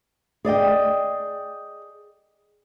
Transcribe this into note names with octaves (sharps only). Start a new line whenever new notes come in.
G#4 D5 D#5 G5